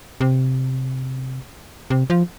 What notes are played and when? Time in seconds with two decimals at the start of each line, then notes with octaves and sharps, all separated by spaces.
0.21 C3
1.90 C3
2.10 F3